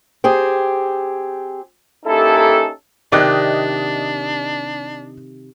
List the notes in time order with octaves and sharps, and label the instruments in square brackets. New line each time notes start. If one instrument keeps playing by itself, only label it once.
[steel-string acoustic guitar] C4 G4 G#4
[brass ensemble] A#3 C#4 D#4 E4 G4 A4
[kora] C3 D#3 [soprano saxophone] D4 [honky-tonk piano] D5 D#5 F#6